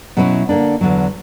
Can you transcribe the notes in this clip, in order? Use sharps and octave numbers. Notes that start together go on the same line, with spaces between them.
B2 F#3 C#4 E4
D3 A#3 D4
E2 D3 F#3